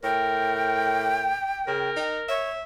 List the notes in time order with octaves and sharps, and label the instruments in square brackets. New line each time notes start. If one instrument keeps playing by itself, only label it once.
[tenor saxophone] A2 [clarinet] A#4 [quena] G5
[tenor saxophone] C#3 [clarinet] A#4
[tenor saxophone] D#4
[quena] C#5 [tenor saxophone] E5